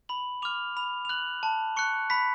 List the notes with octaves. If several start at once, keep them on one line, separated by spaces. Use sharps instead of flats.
B5 F#7
D6 F6 F7
B5 F7
F7
F#6 F#7
A5
C#6 F#6 C#7
B5 B6